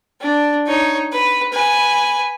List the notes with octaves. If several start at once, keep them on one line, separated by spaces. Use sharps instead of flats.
D4
D#4 C#5
B4
B4 G#5